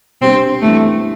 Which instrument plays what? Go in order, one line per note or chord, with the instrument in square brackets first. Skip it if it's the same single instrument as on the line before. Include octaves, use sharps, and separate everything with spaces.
[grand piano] C3 G3 B3 D4 G4 [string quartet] C4
[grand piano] E3 G3 B3 D4 [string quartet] A3